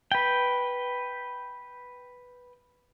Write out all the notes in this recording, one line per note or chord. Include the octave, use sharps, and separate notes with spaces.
B4 G5